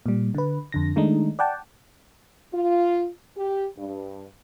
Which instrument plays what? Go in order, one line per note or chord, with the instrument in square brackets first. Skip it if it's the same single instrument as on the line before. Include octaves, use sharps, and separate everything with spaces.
[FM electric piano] A#2 G3
D3 B4
F2 D3 A#6
D#3 G#3 A3 D4 D#4
D5 F#5 G5 A5
[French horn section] F4
G4
G2